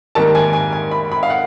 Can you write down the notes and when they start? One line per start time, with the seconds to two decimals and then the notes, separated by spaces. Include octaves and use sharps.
0.15 G#2 D#3 G3 A#3 A5
0.35 G#5
0.53 G#5
0.73 G#5
0.91 B5
1.12 B5
1.23 F5
1.30 F#5